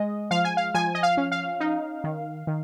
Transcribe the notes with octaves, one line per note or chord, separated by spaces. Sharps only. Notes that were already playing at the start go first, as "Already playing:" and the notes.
Already playing: G#3 D#5
F3 F5
G#5
F5
F3 G#5
D#5
F5
C#4
F5
D#4
D#3
D#3